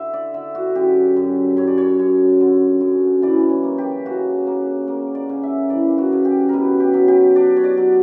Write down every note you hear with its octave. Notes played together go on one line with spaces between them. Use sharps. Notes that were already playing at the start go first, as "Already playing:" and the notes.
Already playing: D3 E5
D5
D3 E5
F#4
F#2 G4
F#2
F#2 C#5
D5
C#5
F#2
D3
F#2
E3 D5
C#5
A#3
G4
C#3 F#4
A#3
A#3
D5
C#3
E5
E3 D5
F#4
C#3
G4
B2 A#4 B4
G4
F#3
G4
D4 D5
C#5
D5
F#3